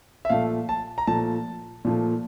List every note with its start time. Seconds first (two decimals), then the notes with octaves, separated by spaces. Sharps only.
0.25 E5
0.30 A#2 F3 A3 F5
0.69 A5
0.98 A#5
1.07 A#2 F3 A3 A5
1.85 A#2 F3 A3